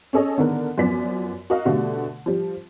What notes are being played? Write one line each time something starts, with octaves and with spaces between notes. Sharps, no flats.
C#4 G#4 A4 C#5 D#5
D3 D#3 B3 A#4
F#2 F3 B3 D5 B6
F#4 A#4 D#5 F5
B2 D3 G3 A3
F3 G3